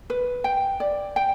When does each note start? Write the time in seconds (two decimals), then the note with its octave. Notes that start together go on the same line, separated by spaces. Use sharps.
0.10 B4
0.44 G5
0.80 D5
1.16 G5